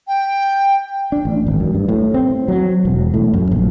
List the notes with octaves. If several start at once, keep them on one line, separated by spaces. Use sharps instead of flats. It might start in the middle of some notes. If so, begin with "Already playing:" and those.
G5
D4
A1
G#1
F#2
G2
A2
C4
F#3
E1
A2
F#2
A#1